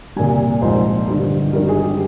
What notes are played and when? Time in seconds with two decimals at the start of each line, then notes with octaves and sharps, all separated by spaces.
0.16 C2 A#2 G3 G#5
0.62 A#1 G#2 F3 G#3 C5
1.08 G1 G2 D#3 G3
1.53 G#1 G2 D#3 G3 A#4
1.69 G#4
1.83 G4